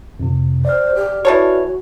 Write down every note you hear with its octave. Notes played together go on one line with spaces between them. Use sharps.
F2 C3
C5 D5 F6
G4
E3 F#4 A4 C#5